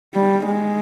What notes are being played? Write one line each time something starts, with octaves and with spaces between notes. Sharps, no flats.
G3
G#3